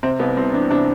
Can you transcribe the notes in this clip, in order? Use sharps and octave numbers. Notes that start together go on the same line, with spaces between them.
C3 C4
C2 B3
C2 C4
E3 D4
C3 D4